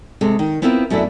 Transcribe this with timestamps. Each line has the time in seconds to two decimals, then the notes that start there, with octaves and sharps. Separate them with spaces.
0.21 C3 G#3 A4
0.39 D#3
0.62 B3 C4 E4 F4 A4 A#4
0.90 F#2 B2 A3 D4 E4